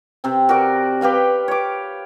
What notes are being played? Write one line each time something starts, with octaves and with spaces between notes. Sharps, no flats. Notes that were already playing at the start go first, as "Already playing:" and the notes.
C3 C4
F#4 A#4 D5
G4 B4 F5 G5
C#5 D6